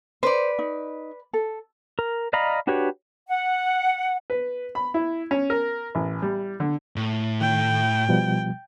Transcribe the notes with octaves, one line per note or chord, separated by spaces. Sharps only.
B4 C5 D5
D#4
A4
A#4
D5 D#5 F5 A#5 B5
D4 F#4 G4 B4 C#5
F#5
B4
B5
E4
C#4
A#4
A1
G3
D3
A2
D#3 G5
B2 F3 G3